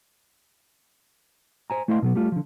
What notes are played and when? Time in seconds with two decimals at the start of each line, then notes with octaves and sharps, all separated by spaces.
1.70 C5 G#5 A#5
1.88 A3 E4 C5 D#5 F5 C6
2.02 B2 F#3 B3
2.15 G3 A3 F4
2.32 D3 F3